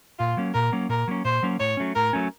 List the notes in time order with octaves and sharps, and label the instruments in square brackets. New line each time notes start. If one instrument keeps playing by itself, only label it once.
[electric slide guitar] A#2 [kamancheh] F4
[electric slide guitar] F#3 A#3 C#4
[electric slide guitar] A#2 [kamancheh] A#4
[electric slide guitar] F#3 A#3 C#4
[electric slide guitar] A#2 [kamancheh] A#4
[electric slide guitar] F#3 A#3 C#4
[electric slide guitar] A#2 [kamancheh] C5
[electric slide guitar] F#3 A#3 C#4
[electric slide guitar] A2 [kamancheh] C#5
[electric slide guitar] F#3 A3 C#4
[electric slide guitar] A2 [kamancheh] A#4
[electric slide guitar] F#3 A3 C#4